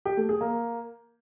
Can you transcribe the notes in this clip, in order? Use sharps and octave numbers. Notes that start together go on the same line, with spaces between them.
G4
A3
G#4
A#3